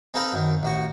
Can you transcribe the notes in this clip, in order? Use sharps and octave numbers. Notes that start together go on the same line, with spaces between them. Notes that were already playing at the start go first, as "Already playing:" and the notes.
C4 D#4 A4 B4 F5 B5
F#2 D#3
A1 F#4 C#6